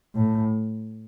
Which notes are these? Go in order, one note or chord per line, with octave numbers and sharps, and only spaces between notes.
A2